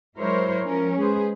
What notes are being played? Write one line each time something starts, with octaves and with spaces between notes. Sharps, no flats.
F#3 G#3 E4 A#4 C5 C#5
F3 C#4 A#4
G#3 G#4 B4 C5